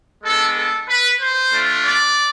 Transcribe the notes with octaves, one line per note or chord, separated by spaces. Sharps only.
G#3 B3 D4 A4
A4
B4
C5
A3 D4 F4
D5